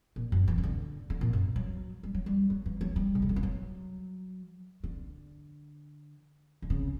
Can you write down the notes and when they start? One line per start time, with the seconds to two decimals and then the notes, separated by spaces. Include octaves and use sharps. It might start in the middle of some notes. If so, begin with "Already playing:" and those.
0.16 A#2
0.32 F#2
0.48 E3
0.58 C#3
0.63 D3
1.10 D3
1.21 A#2
1.33 F#2
1.56 F#3
2.03 G3
2.15 F#3
2.26 G3
2.50 F#3
2.66 E3
2.81 F#3
2.96 G3
3.15 B2
3.22 C#3
3.29 D3
3.36 E3
3.43 F#3
4.84 D3
6.62 D3
6.70 C#3